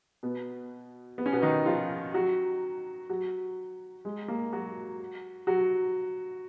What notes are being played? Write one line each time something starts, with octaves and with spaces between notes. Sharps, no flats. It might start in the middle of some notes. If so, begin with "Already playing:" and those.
B2 B3
B3
C#4
B2 B3
D#3 D#4
F3 F4
F#3 F#4
F#3 F#4
G#3
A#3
F#3 F#4
F#3 F#4